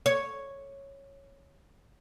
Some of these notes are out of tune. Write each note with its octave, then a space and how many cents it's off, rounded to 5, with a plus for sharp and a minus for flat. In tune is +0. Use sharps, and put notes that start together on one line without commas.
C#5 -5